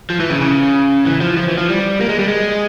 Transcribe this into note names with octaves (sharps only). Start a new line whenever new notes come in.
F3
E3
C#3
C#3
E3
F3
F3
E3
F3
G3
A#3
G#3
G3
G#3